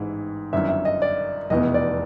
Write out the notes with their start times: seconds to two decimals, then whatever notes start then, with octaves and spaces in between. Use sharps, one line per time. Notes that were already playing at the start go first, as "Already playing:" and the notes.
Already playing: A1 G#2 E3
0.53 G1 F#2 D#3 E5
0.69 E5
0.85 D#5
1.02 D5
1.50 F1 E2 B2 D#5
1.74 D5